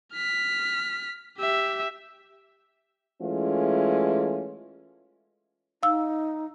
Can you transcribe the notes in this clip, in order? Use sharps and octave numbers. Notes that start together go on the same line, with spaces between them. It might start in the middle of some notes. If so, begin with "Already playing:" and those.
F6 B6
G4 E5
E3 G#3 A3 C#4 F4
D#4 F5 E6